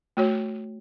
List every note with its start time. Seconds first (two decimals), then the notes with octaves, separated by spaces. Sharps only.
0.17 A3 F#4 C#5